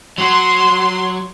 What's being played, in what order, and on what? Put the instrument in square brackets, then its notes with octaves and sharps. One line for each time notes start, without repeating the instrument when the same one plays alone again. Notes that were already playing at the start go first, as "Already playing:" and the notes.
[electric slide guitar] F#3 F#4 [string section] C6